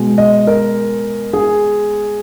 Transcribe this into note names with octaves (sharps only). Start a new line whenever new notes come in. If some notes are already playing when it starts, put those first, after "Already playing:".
Already playing: B2 G#3
D#5
A#4
G#4